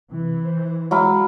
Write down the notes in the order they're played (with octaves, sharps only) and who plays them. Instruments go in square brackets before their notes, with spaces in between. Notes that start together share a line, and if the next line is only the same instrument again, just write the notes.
[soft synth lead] C3 [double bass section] E3
[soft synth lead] C5
[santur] F#3 E4 F5 [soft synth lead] G#3